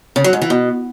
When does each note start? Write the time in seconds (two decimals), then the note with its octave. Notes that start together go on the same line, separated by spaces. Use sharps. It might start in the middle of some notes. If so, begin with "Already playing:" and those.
0.16 C#3
0.24 F#3
0.33 G#2
0.42 E3
0.50 B2